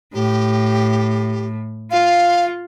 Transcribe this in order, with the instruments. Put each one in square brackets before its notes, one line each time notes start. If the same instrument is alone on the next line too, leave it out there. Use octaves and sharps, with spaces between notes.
[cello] A2 [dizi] G4
[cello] F4 [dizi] F5